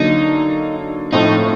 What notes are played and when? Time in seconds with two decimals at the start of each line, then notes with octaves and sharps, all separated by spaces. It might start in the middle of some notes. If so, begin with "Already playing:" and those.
Already playing: D3 F#3 A#3 D4 D#4
1.13 A2 F3 A3 C4 D#4